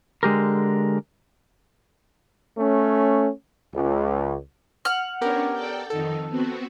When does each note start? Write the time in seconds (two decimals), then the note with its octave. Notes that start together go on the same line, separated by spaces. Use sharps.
0.23 D3 G#3 G4 A#4
2.57 A3 C#4
3.74 C#2
4.85 F#5 F6
5.21 B3 C#4 D4 G4 A#4 C#5
5.53 A4 D5 G5
5.90 F2 D#3 D#4 A4
6.29 B3 C4 F#4